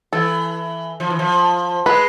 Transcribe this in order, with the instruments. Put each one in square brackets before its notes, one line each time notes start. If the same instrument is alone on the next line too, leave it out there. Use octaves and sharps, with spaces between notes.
[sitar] E3 [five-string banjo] A4
[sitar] F3
E3
F3
[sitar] G#3 [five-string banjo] B4